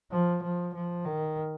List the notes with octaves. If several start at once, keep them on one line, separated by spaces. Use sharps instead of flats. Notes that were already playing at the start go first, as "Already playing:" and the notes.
F3
F3
F3
D#3